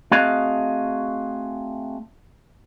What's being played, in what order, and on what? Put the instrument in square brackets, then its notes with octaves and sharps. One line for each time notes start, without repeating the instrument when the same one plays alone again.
[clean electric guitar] A3 C4 F#4 G#4 D#5 F5